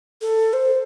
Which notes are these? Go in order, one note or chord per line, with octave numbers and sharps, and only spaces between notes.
A4
C5